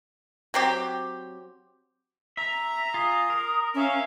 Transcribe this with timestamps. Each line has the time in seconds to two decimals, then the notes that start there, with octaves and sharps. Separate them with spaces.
0.54 F#3 C4 G4
2.37 E5 A#5
2.94 F4 G#4 D#6
3.30 A#4
3.75 C#4 E5 F5